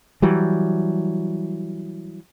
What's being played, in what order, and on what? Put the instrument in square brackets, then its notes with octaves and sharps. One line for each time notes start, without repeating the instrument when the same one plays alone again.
[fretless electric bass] E3 F#3 G3